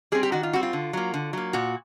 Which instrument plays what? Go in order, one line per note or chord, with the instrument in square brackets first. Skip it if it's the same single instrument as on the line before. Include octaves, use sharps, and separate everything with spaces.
[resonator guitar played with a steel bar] G3 C4 G#4
G4
D#3 F#4
F4
G3 C4 F#4
F4
D3
F#3 A#3
D3
F#3 A#3
A#2 F#4